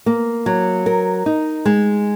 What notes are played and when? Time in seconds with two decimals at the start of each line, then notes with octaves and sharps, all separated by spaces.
0.06 A#3
0.46 F#3
0.86 A#4
1.26 D#4
1.65 G#3